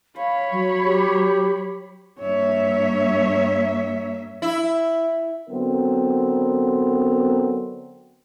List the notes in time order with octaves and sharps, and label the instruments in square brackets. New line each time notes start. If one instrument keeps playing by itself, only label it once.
[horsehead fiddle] C#5 B5 [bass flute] F5
[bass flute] F#3
[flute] G4
[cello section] G2 A#3 E5 [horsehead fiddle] C#5
[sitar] E4
[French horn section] D3 F#3 B3 C4 A#4